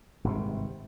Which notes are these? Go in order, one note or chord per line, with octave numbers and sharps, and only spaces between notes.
G#1 G2 C3